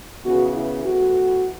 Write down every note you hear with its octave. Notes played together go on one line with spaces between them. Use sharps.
C#3 E3 B3 F#4
E4
A2 E3 B3 F#4